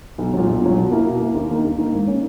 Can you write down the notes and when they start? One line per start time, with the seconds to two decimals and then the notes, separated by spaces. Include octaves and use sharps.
0.18 B1
0.34 A#2 F#3
0.47 B1
0.62 A#2 F#3
0.76 B2
0.91 A#3 E4
1.06 B2
1.20 A#3 E4
1.35 D#2
1.49 D#3 A#3 D#4
1.65 D#2
1.78 D#3 A#3 D#4
1.93 G#2
2.07 D#3 A#3 C#4